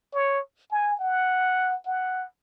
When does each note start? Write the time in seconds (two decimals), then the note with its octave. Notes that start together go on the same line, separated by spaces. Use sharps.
0.14 C#5
0.71 G#5
0.99 F#5
1.86 F#5